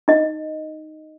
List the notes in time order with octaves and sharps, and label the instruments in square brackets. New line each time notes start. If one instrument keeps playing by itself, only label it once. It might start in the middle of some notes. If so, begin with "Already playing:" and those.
[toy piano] D#4 D#5